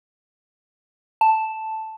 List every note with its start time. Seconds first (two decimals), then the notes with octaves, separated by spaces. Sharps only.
1.21 A5